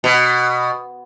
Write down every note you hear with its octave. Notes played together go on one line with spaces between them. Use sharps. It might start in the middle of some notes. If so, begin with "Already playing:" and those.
B2